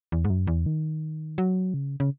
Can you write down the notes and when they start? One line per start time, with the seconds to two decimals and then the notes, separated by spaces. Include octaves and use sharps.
0.12 E2
0.25 G#2
0.30 F#2
0.47 E2
0.66 D#3
1.38 F#3
1.74 C#3
2.00 C#3